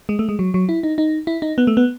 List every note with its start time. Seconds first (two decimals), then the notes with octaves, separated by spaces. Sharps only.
0.09 G#3
0.19 A3
0.29 G#3
0.39 F#3
0.54 F#3
0.69 E4
0.83 D#4
0.98 D#4
1.27 E4
1.42 D#4
1.58 B3
1.67 A3
1.77 B3